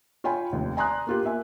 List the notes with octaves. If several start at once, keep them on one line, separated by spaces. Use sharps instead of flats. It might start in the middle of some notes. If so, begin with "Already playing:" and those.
F4 C#5 G5 G#5 B5
F1 D#2
D5 G#5 A#5 C6 D#6 F#6
A#3 F4 G4
A#3 E5 G#5